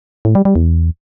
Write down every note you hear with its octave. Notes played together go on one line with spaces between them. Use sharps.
A2
G3
G3
E2